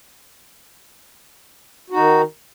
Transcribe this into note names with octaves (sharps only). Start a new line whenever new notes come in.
D#3 D#4 F#4